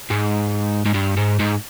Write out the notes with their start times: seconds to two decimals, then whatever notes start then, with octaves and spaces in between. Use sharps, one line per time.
0.10 G#2
0.85 G#2
0.94 G2
1.17 G#2
1.39 G#2